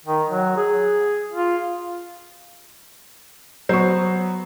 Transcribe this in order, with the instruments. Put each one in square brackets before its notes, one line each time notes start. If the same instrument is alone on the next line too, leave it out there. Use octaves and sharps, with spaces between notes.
[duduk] D#3
F#3
G#4
F4
[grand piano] F#3 B3 [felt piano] C5 C#6